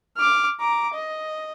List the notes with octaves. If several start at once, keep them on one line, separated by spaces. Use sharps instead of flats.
D6 F6
A#5 D6
D#5